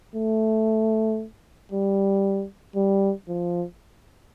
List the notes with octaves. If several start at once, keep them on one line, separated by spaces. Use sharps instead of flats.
A3
G3
G3
F3